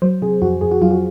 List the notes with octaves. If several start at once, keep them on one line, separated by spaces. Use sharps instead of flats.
F#3 C5
C3 G#4
F2 F#4
F2 G#4
F#4
F#3 F4
F#4